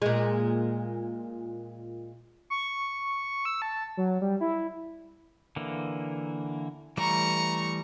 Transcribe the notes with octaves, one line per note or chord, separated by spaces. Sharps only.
A#2 G#3
C#6
E6
A5
F#3
G3
E4
D3 E3 A#3
E3 G3 A3 A#5 C#6